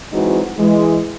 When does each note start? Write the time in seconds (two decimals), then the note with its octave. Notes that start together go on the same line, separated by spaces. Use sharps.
0.12 E3 F#3 G#3 C4 D#4 F#4
0.58 E3 G#3